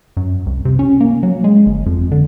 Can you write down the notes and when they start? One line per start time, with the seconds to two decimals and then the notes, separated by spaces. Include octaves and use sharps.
0.17 F#2
0.46 C2
0.65 C3
0.79 C#4
1.01 A#3
1.23 F#3
1.44 G#3
1.66 G1
1.86 F2
2.12 D3